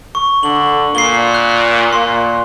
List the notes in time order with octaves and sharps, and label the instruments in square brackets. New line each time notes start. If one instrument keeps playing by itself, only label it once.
[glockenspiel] C#6
[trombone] D3 [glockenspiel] F#7
[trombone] A#2 [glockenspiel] C7 G7
[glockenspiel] F#6
[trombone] A#2 [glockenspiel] C6